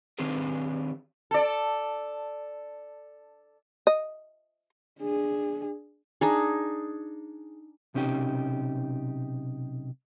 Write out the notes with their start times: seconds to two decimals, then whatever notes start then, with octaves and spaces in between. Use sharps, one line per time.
0.19 D#3 C4 D4 G4 G#4 B4
1.31 A4 D5
3.87 D#5
5.00 D4 G#4
6.21 D4 D#4 G#4
7.94 B1 C3 C#4 D#4 G4